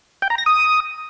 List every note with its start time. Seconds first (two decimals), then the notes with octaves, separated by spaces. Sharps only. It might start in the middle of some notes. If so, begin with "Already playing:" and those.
0.22 G5
0.30 A#5
0.38 A#6
0.46 D#6